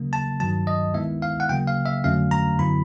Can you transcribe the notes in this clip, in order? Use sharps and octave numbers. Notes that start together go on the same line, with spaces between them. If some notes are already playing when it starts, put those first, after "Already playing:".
Already playing: C#3 F#3 A#3
A5
G2 D#3 F#3 A5
D#5
D#3 G#3 B3 E4 E5
F5
F#5
C#3 F#3 A#3 G5
F5
E5
F2 D3 F#3 A3 C#4 F5
A#5
F#2 D3 F#3 B3 E4 B5